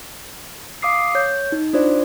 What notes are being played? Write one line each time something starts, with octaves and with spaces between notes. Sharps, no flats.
F5 D6 D#6 C7
C#5 G6
D#4
D4 F4 C5 D5